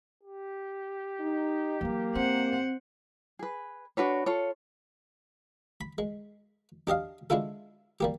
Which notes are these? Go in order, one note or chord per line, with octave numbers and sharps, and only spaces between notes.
G4
D#4
E3 F#3 A#3
C4 C5 F#5
G#4 B4
D4 F#4 B4 C#5
F4 A4 C#5
B5
G#3
D4 G4 D#5 F5
G#3 D4 E4 F4 A4
G3 A#3 G4